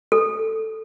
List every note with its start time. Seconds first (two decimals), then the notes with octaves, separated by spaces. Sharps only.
0.12 A4